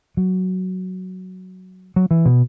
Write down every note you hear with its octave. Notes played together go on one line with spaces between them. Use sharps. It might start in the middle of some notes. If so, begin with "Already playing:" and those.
F#3
F#3
E3
B2